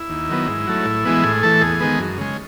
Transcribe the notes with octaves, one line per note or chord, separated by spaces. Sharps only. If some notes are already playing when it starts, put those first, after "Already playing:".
Already playing: E4
D#2
D#3 F#3 B3
G#2
F#3 A3
A2
E3 G#3 B3
A2 G#4
E3 A3 A4
E2 G#4
D#3 G#3 B3
F#2
C#3 G#3